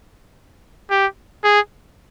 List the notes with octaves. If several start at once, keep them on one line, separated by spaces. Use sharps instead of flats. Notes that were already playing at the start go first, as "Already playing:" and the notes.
G4
G#4